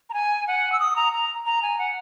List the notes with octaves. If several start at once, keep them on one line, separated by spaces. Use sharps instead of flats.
A#5
G#5
F#5
E6
D#6
A#5
A#5
A#5
G#5
F#5